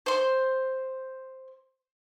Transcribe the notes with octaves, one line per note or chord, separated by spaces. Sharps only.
C5 C6